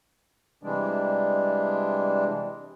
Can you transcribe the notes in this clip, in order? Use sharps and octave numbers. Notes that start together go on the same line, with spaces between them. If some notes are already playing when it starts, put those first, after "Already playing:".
C3 E3 G3 G#3 D4